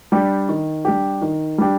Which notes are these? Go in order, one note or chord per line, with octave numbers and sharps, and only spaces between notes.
G3 D4 G4
D#3
G3 D4 G4
D#3
G3 D4 G4